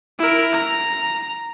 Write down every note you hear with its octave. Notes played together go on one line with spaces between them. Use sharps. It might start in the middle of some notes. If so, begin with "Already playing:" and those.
E4 A#4
A#5